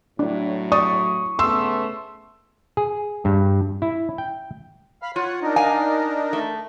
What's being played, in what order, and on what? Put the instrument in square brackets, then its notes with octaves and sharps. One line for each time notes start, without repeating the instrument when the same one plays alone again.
[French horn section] A2 F#3 [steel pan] D4
[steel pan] D5 [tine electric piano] C#6 [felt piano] D#6
[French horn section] C#3 A3 B3 [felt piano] C6 E6
[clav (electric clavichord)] G#4
G2
E4
G5
[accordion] F5 B5 F6
[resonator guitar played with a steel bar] F4 [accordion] C#5 F#5
[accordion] D4 D#4 A#4
[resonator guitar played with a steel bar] F5 G#5
A3